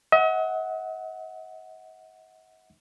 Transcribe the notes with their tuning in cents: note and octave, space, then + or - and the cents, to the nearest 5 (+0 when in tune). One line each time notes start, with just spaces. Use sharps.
D#5 +45 F#5 +0